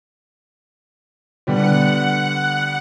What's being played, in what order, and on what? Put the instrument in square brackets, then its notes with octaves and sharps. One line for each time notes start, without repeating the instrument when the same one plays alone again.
[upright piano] D3 G3 B3 [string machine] F#5